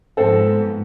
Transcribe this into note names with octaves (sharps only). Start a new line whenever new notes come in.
G#2 F3 B3 C4 A4